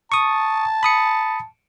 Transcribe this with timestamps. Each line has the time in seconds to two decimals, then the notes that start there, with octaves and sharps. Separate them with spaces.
0.12 A5 C#6 D#6
0.83 B5 D#6 C#7